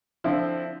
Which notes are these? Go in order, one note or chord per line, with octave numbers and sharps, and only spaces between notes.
D3 F3 C4 E4